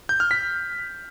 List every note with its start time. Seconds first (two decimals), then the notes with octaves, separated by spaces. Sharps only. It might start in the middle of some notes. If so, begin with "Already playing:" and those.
0.09 G6
0.20 F6
0.31 B6